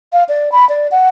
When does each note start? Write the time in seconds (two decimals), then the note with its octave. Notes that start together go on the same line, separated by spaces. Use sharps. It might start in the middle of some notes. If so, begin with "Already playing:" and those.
0.13 F5
0.29 D5
0.52 B5
0.69 D5
0.92 F#5